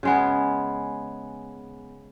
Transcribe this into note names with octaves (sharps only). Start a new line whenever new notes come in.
C#3 G#3 B3